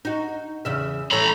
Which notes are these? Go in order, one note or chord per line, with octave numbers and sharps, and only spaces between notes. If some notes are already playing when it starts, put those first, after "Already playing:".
D#4 F#4
E2 C#3 E5
E3 A3 C#4 A#5 B5